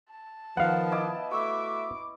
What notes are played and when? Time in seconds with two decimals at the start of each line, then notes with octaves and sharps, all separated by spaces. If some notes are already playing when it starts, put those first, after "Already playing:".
0.10 A5
0.57 D#3 F3 B3 F5 F#5
0.92 E4 D#5 D6
1.31 A3 F#4 E5 C#6 D6